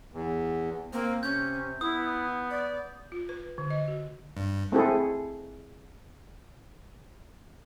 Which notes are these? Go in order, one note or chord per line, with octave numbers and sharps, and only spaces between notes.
E2
A#3 C4
C3 C#4 G6
B3 E4 D#6
D5
F4
B4
D3
D#5
F#4
G2
A3 C4 E4 G#4 A4